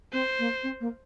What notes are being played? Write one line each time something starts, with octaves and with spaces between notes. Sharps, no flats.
C4 C5
A#3
C4
A#3